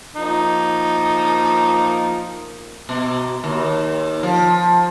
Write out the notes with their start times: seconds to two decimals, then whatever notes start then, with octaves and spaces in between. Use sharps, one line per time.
0.15 F3 A#3 D#4
2.89 B2
3.44 D#2
4.23 F3